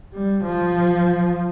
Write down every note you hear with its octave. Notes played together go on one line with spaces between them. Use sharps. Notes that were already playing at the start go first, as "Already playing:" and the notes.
G3
F3